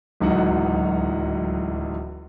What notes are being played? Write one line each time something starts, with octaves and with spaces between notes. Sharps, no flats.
D1 C#2 E3 F#3 D#4 F#5